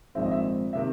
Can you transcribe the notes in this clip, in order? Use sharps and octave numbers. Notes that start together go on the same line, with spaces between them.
A#1 G#2 D#3 G#3 C4 E5
D#5
E5
C3 D#3 E5